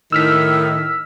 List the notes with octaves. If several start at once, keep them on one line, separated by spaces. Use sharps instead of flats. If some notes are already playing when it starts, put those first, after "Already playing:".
A2 D#3 E6 F6 B6